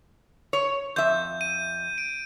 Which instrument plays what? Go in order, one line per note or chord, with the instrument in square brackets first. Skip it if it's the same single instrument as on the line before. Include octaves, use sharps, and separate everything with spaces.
[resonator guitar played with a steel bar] C#5
[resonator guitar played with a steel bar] F2 E5 [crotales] G6
[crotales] D#7
D7